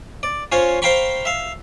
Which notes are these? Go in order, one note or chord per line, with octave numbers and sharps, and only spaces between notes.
D5
C#4 F4 C5 C#5
C5 F5 G5 A#5 B5 C#6
E5 F5